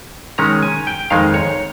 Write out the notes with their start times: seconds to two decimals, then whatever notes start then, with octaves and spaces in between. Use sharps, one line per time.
0.38 D#3 G#3 C#4 A#5
0.62 G#5
0.87 G5
1.10 F2 D#3 G#3 D#4 F5
1.34 C#5